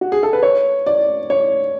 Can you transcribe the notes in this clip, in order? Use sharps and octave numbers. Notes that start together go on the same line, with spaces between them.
F#4
G#4
A4
B4
C#5
D5
C#5